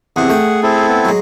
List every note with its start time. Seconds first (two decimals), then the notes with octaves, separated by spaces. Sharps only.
0.16 E2 C3 G#4 F#5
0.29 A3 G5
0.63 C4 E4 A4
0.89 B3
1.05 F#3 G#3